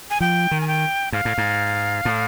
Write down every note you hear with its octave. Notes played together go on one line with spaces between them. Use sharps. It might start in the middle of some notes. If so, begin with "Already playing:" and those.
G#5
F3 G5
D#3
G#5
G5
G#2 F5
A2
G#2
A2